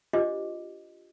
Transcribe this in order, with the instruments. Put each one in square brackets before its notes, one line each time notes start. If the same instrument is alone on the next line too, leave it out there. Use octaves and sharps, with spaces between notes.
[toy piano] D4 F4 G4 C5 D#5 D6